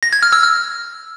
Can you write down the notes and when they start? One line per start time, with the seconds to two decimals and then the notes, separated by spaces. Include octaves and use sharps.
0.03 A#6
0.13 G#6
0.23 F6
0.33 E6
0.42 F6